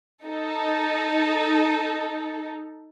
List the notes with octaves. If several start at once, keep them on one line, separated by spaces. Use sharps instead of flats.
D#4 A4